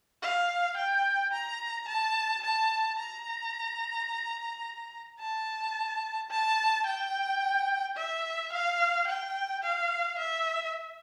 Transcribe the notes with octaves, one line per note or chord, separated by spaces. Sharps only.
F5
G5
A#5
A5
A5
A#5
A5
A5
G5
E5
F5
G5
F5
E5